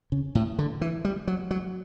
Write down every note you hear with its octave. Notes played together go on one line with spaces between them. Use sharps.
C#3
A2
D3
E3
G3
F#3
F#3